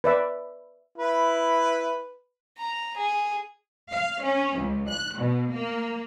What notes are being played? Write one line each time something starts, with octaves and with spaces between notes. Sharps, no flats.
B4 D5 E5
E4 B4
A#5
G#4
F5
C#4
C#2
F#6
B2
A#3